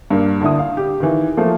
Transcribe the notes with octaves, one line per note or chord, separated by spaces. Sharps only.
G2 A#3
D2 D4 E4 D#6
F5
G4
D#3 E3
F3 A3 A#3